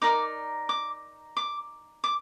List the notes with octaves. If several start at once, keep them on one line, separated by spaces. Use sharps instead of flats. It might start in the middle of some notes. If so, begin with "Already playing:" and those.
D#4 A#4 D5 D6
D6
D6
D6